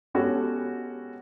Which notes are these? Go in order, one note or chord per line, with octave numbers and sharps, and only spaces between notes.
G#3 B3 C#4 F#4 G4 A4